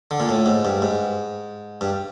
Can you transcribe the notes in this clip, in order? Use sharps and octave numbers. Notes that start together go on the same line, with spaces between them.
D3
A#2
A2
G#2
G2
G#2
G2